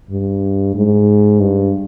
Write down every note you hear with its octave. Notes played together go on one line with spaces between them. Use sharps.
G2
G#2
G2